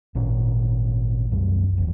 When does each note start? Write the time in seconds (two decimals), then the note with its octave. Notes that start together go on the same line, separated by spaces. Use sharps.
0.15 G#1 A#2 C#4
1.31 C2 F#2 G3
1.78 F1 E2